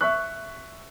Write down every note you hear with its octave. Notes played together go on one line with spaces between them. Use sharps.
E5 C#6 F#6